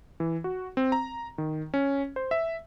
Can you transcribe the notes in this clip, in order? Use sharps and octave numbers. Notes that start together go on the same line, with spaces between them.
E3
F#4
C4
A#5
D#3
C#4
C5
E5